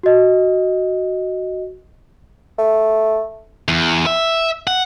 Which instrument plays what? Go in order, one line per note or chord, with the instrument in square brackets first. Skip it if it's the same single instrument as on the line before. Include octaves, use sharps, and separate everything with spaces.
[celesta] F#4 D#5
[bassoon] A3
[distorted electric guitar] E2
E5
F#5